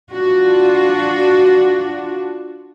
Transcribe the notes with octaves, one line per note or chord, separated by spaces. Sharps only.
D4 F4 F#4